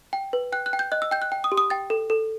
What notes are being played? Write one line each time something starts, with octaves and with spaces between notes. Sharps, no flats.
G5
B4
G5 F#6
F#6
G5
G6
D#5 F#6
E6
G5 G6
F#6
G5
D#6
G4
D#6
G5 A6
A4
A4